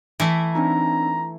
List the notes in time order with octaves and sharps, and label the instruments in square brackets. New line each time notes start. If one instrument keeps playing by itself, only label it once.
[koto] E3 A3 E4
[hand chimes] C4 D4 D#4 [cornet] A#5